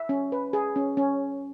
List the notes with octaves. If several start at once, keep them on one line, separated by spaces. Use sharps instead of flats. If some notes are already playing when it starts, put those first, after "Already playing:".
Already playing: E5
C#4
B4
G#4
C#4
C#4